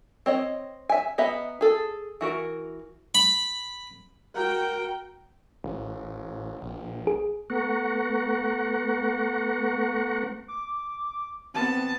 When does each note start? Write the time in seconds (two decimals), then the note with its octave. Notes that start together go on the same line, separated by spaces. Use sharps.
0.26 C4 C#5 D#5
0.89 E5 G#5
1.18 B3 D#5 E5 A#5 B5
1.61 G#4 A4
2.21 E3 F#4 A#4
3.15 B5
4.36 F#4 A#4 G5
5.64 A1
6.62 A#1
7.07 G#4
7.50 A3 B3 F#5 A#5 C#6
10.48 D6
11.54 B3 C4 A5